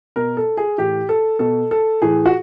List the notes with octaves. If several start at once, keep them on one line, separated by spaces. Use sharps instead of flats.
B2 A#4
A4
G#4
A2 E3 G4
A4
B2 A4
A4
A2 E3 G#4
F#4